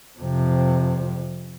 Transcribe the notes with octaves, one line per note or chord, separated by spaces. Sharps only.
F2 C3